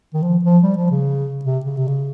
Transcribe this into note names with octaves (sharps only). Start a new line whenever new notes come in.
D#3
F3
F3
G3
F3
C#3
C3
C#3
C3
C#3